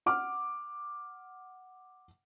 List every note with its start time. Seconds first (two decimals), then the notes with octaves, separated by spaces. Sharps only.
0.06 F#5 D6 F6